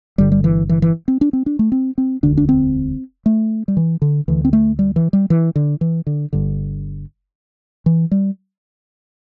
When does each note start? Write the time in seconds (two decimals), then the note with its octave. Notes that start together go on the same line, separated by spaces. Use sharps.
0.18 G1 G2 D3 G3
0.32 G3
0.44 E3
0.69 E3
0.82 E3
1.08 C4
1.21 D4
1.33 C4
1.46 D4
1.59 A3
1.72 C4
1.98 C4
2.23 E1 D2 D3 D4
2.37 D4
2.49 C4
3.26 A3
3.68 G3
3.77 E3
4.02 D3
4.28 D2 D3 E3
4.45 C4
4.53 A3
4.79 G3
4.96 E3
5.13 G3
5.30 E3
5.56 D3
5.81 E3
6.07 D3
6.33 G1 G2 D3
7.86 E3
8.11 G3